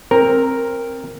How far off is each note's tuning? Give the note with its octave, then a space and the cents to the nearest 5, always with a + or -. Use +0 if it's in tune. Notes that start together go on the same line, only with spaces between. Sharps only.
C4 +20 A#4 +0